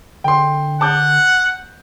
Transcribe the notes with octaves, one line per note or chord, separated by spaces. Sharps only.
D3 G5 C6
F#5 A5 D6 G6